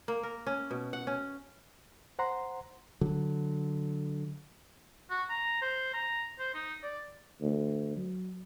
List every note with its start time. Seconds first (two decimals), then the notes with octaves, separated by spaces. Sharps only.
0.08 A#3
0.23 A#4
0.47 C#4
0.71 B2
0.93 F#5
1.07 C#4
2.19 C5 F#5 A#5 C6
3.01 D3 F#3
5.10 F#4
5.30 A#5
5.62 C5
5.93 A#5
6.39 C5
6.54 D#4
6.83 D5
7.41 D2
7.97 F#3